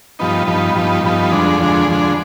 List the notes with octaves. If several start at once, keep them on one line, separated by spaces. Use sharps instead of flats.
G2 F3 B3 D#4
G2 F3 B3 D#4
G2 F3 B3 D#4
G2 F3 B3 D#4
F2 D3 G#3 D4
F2 D3 G#3 D4
F2 D3 G#3 D4